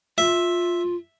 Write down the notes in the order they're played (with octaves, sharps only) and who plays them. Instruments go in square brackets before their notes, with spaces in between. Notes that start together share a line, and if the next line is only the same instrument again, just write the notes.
[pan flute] F4 [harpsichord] E5